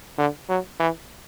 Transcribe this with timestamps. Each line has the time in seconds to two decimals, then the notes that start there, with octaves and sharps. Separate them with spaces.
0.18 D3
0.49 F#3
0.79 E3